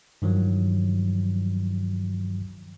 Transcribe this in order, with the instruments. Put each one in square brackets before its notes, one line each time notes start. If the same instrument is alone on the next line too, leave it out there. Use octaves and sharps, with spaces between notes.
[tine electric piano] G2 D#3 F3 F#3